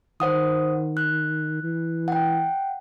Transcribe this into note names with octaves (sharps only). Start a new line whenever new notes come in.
D#3 C5 F#5 D#6
F#6
E3
F#5 G5